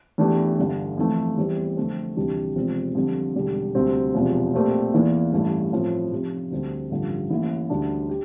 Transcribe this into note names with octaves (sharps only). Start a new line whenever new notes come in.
E2 E3 A3 D4 G4
G1 G2 D3 G3
F2 E3 A3
E2 E3 G3 C4
F2 D3 A3 C4
D2 C3 E3 G3 D4
E1 E2 C3 F3 C4
F2 D3 G3
E1 E2 D3 G3
D2 C3 G3 C4
E1 E2 C3 F3
A#2 A3 C4 G4 A#4
E2 E3 A#3 E4
A1 G2 E3 A3 E4
A2 F3 C4
F1 F2 C3
D2 D3 G3 C4
A1 G2 D3 F3
A1 A2 E3 A#3 E4
D2 D3 G3 D4
G4